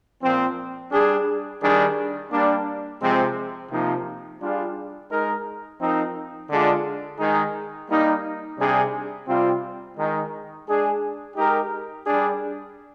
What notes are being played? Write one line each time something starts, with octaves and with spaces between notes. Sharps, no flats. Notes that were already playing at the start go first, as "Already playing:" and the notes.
A#2 F3 C4
G3 D4 G#4
D#3 G3 D4 G#4
G3 A#3 D4
C3 F3 G#3 C4
C3 F3 A#3 D#4
G3 D4 F4 G#4
G#3 D#4 A#4
F3 C4 D#4 A#4
D3 G#3 D4 F4 G#4
D#3 G#3 D#4 G#4
G3 A#3 D#4
C3 G3 D4 G#4
C3 G3 C4 F4
D#3 G#3 D#4
G#3 D4 G#4
G#3 D#4 G4 A#4
G3 D4 G#4